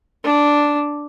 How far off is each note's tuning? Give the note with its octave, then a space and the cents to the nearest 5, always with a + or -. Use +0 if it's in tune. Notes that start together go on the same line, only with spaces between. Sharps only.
D4 -5